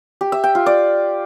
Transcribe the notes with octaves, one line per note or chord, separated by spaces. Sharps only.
G4
E5
G5
F4
D5